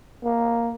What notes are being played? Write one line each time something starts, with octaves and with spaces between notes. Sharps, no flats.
A#3